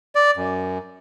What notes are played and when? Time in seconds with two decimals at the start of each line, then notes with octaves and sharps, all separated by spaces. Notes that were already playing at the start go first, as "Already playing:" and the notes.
0.15 D5
0.37 F#2